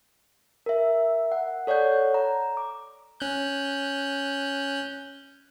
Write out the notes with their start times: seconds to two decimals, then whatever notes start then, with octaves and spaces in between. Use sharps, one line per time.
0.66 A#4 E5
1.32 F#5
1.67 A4 C#5 D5 F#5 G6
2.14 A#5
2.57 D6
3.20 C#4 F#6 G6